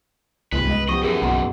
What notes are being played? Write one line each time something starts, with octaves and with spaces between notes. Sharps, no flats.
D1 G1 C2 B4
C#2 D#5
F3 B3 G4 D#5 C#6
F#2 E3 G#4 A#4 E5
F#1 B1 B2 F#5 A#5 C6